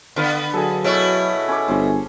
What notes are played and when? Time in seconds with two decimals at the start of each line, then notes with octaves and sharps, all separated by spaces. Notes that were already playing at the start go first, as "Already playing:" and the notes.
0.16 D3 B3 F5 B5 C6
0.54 F#3 G#4 A4
0.84 B2 A3 E4 C#5
1.48 C#4 B4 D6
1.68 G1 C#4 C5